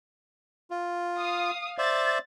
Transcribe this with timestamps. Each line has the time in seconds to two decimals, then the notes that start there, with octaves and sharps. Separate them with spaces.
0.70 F4
1.18 F5 D#6
1.78 C5 D5 E5 A6